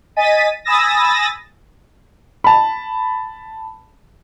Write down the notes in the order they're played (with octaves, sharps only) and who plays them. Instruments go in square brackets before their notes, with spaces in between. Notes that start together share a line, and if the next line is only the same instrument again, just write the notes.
[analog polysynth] D#5 G#5 A6 B6 D#7
G#5 B5 D#6 E6 A6 A#6
[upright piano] A5 B5